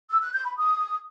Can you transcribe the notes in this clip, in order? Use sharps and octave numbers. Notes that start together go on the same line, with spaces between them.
E6
F#6
G6
B5
D#6